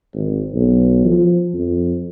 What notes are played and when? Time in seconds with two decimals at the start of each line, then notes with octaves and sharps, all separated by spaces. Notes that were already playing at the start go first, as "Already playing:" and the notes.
0.14 G#1
0.54 B1
1.05 F3
1.54 F2